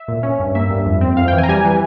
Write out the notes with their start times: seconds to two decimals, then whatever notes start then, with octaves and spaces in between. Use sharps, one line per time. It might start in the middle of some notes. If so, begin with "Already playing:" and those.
Already playing: E5
0.08 A#2
0.23 C#4
0.40 G2
0.55 A#3 E5
0.71 G2
0.86 F2
1.01 C4
1.17 F2 F5
1.28 G5
1.33 E3
1.38 G#5
1.43 A#5
1.49 G3 G#5
1.65 E3